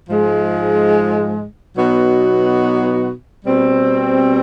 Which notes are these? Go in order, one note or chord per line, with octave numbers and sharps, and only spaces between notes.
G#2 F3 G#3
B2 F#3 B3 D#4 F#4
B2 G3 C4